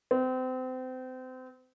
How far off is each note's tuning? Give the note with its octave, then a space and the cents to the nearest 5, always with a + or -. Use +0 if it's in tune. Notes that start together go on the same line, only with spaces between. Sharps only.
C4 -30